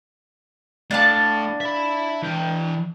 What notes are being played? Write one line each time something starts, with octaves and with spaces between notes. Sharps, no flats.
A2 D4 F5 A5
E5 B5
E3 G5